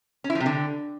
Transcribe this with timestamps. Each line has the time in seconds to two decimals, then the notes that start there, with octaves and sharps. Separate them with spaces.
0.24 C#4
0.30 E4
0.35 F3
0.40 C3
0.46 D3